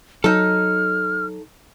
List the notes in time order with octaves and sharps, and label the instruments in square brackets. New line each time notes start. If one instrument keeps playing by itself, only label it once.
[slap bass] F#3 [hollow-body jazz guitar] D#4 A4 [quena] F6